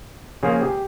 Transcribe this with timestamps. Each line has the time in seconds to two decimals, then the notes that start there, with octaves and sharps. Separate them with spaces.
0.43 C#3 F3 A#3 G#4
0.61 G4